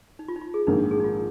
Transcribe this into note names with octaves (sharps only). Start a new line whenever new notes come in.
D#4
F4
D#4
F4
G#4
A#1 G#2 D#3 A#3 D#4
D#4
G#4
D#4
F4